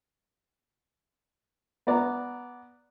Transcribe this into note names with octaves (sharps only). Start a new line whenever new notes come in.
B3 D5 A#5